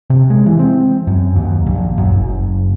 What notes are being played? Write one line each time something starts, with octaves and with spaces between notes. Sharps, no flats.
C3
G#3
E3
C4
F#2
D#2
A#1
F#2
F#1